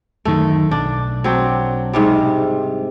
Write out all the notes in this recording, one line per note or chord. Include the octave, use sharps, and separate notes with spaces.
D1 F#2 D#3 A3
B1 D4
F#3 C4 D4
G#2 C3 G3